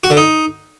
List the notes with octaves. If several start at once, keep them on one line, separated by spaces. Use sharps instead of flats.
F#4
D3
D#4